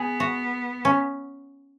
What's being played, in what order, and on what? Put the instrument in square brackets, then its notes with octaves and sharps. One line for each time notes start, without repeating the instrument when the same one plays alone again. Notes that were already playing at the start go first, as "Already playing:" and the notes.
Already playing: [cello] B3 [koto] G#4
[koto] F#4
C#4